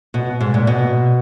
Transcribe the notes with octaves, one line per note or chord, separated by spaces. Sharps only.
B2
G#2
A#2
B2